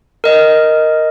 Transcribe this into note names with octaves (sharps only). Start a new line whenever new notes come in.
A#4 D#5